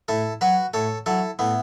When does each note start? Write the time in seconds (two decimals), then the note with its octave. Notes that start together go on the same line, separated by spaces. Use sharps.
0.08 A2 E4 A4
0.41 F#3 F#4 B4
0.74 A2 A4 C#5
1.06 F#3 E4 A4
1.39 A2 B3 E4